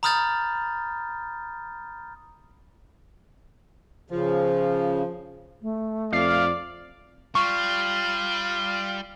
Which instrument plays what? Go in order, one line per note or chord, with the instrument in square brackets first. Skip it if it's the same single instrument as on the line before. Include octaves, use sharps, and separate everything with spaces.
[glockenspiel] A#5 B5 D#6 F6 G6 A6
[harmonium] C#3 [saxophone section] F3
[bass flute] A3
[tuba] F2 [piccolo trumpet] D5 [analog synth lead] F5
[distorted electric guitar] G3 [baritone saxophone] F4 [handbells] C#6